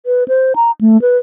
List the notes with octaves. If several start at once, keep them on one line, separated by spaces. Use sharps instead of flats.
B4
C5
A#5
A3
B4